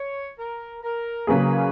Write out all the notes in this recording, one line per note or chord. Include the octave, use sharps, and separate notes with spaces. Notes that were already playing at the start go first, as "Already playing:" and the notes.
Already playing: C#5
A#4
A#4
C#3 F#3 A#3 C#4 G#4 B4